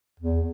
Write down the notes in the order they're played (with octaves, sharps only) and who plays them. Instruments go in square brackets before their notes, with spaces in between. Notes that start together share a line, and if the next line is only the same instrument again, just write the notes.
[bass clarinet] E2